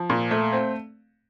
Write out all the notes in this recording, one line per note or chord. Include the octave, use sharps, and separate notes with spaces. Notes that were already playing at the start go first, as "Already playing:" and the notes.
Already playing: F3
A#2
A3
C4